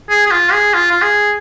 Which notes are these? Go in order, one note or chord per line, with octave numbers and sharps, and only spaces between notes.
G#4
G#4
F4
G#4
F4
F4
G#4